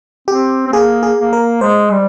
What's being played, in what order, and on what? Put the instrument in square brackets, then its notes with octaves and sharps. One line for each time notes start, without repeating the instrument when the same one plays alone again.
[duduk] C4 [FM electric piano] G4
[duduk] C4
[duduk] A#3 [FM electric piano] G#4
[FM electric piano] G#4
[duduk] A#3
[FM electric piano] A#4
[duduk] G#3 [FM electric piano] C5
[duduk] G3